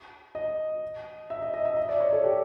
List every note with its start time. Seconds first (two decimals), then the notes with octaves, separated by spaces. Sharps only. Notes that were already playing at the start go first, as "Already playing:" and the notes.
0.35 D#5
1.30 E5
1.42 D#5
1.54 D#5
1.65 E5
1.77 D#5
1.89 D5
2.00 C#5
2.12 A4
2.24 G4